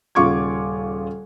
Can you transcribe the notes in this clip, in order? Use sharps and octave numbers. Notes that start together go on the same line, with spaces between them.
D#1 C#3 F4 C#6 D6 G#6